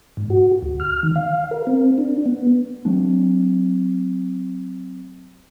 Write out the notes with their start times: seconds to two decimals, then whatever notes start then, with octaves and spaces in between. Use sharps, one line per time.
0.17 G#2
0.30 F#4
0.62 D2
0.80 F6
1.03 D#3
1.16 F5
1.51 A#4
1.67 C4
1.98 D4
2.26 B3
2.85 F#3 A3 C4 D4